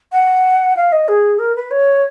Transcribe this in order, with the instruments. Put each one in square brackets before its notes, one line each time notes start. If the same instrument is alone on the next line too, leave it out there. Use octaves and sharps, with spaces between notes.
[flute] F#5
F5
D#5
G#4
A#4
B4
C#5